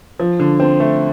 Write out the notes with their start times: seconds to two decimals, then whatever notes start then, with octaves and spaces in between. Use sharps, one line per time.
0.19 F3
0.40 D3
0.60 C4
0.80 A3